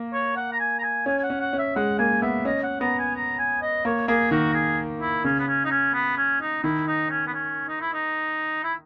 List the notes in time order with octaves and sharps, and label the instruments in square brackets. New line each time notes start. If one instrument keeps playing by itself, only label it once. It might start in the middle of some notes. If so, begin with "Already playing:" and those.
Already playing: [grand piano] A#3
[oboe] C#5
F#5
A#5
G#5
A#5
G#5
[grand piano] C#4 [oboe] G#5
[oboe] G#5
F#5
[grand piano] C#4
[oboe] F#5
[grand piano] C#4
[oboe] E5
[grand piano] G#3 [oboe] F#5
[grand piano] A#3 [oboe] G#5
[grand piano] B3 [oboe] E5
[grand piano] C#4 [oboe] D#5
[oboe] F#5
[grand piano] B3 [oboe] A#5
[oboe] G#5
A#5
G#5
D#5
[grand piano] A#3 [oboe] C#5
[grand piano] A#3 [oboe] G#4
[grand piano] D#3 [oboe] F#4
[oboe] G#4
E4
[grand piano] C#3 [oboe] C#4
[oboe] B3
C#4
D#4
C#4
B3
C#4
D#4
[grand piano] D#3 [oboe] E4
[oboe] D#4
C#4
B3
C#4
D#4
E4
D#4
E4